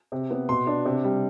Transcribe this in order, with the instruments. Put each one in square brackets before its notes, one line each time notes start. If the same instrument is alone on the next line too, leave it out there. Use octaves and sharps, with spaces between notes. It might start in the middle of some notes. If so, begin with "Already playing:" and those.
[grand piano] C3
B3
B2 C6
D4
C3
G3